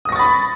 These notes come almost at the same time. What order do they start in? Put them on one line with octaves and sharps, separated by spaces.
D#6 A#6 C#6 A6 B5